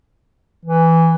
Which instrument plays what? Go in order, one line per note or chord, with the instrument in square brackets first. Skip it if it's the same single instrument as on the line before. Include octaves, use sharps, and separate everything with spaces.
[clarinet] E3